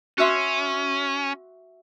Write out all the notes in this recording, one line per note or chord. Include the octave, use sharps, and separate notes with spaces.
C#4 F#4 E5 C6